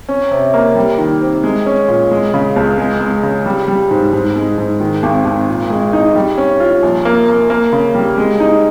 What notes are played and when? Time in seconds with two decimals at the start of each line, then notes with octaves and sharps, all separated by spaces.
0.09 C#4
0.31 C3
0.54 A#3
0.76 G3
0.98 D#3
1.22 C4
1.44 G#3
1.66 C#4
1.88 A#2
2.11 G#3
2.34 C#3
2.56 C#2
2.78 G#3
3.01 G#3
3.23 C#3
3.46 G3
3.68 G3
3.91 G#2
4.13 G#2
4.36 G#3
4.58 G#2
4.80 D#3
5.03 G#1
5.25 G#1
5.48 A#2
5.70 G#3
5.93 D#4
6.15 G3
6.38 C#4
6.60 F4
6.83 A#1
7.05 A#3
7.28 A#3
7.50 A#3
7.73 C#3
7.95 G3
8.18 G#3
8.40 D#4